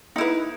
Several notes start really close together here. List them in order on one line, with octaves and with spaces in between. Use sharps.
D#4 E4 B4